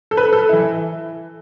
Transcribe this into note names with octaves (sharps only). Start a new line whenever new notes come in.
A4
B4
A4
E3 E4